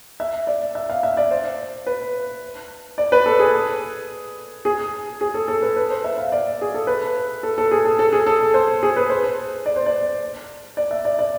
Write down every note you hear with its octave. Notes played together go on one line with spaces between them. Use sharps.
E5
D5
E5
F5
E5
D5
C5
B4
D5
B4
A4
G#4
G#4
G#4
A4
A4
B4
B4
C5
E5
F5
D5
G#4
A4
B4
A4
A4
G#4
A4
A4
G#4
A4
C5
G#4
B4
C5
D5
C5
D5
D5
E5
D5
D5